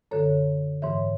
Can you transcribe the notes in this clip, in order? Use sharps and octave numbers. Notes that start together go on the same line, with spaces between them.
F#2 D3 A4 C#5
G#2 E3 C#5 E5